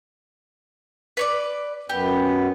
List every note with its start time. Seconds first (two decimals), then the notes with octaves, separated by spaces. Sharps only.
1.17 B4 C#5 D5
1.89 F#2 B3 G4